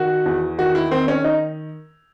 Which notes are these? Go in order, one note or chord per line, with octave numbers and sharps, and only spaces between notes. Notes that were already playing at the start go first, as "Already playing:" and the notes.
Already playing: D#3 F#4
E2
D#3 F#4
E4
D#3 C4
C#4
D#4